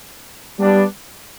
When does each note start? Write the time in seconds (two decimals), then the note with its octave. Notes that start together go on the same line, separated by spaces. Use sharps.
0.59 G3 B3 D4